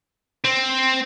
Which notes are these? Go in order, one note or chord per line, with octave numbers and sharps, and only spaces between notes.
C4